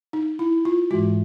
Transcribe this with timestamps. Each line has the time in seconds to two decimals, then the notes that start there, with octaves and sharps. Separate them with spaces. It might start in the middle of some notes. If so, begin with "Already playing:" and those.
0.13 D#4
0.39 E4
0.65 F4
0.91 G#2 E3 G#3 F#4